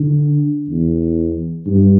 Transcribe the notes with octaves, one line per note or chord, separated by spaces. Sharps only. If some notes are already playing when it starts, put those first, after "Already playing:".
Already playing: D3
E2
G2